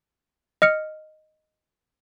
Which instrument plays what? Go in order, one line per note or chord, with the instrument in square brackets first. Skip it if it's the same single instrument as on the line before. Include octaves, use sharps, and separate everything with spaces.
[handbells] D#5 F6 C#7